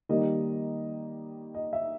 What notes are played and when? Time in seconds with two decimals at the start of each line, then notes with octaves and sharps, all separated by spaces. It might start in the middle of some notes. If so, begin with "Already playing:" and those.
0.09 D#3 G3 A#3 D#5
1.55 D#5
1.73 E5